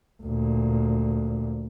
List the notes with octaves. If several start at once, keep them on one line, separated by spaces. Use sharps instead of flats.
D2 A#2